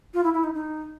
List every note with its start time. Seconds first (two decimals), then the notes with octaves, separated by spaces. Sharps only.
0.14 F4
0.23 E4
0.34 E4
0.44 D#4
0.54 D#4